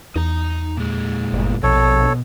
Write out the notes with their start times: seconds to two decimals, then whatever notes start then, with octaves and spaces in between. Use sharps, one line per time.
0.16 E2 D#4 A#5
0.77 A#2 G#3
1.33 G1
1.63 A#1 B2 A4 C#5